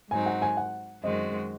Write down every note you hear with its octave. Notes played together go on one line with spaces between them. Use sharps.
G#2 F#3 C4 D#4 G#5
F#5
G#5
F#5
F#2 D#3 G#3 C4 F#4 D#5